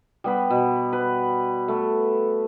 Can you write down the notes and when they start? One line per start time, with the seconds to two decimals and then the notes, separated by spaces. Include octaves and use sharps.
0.24 G3 B3 B4
0.50 B2
0.93 B4
1.68 A3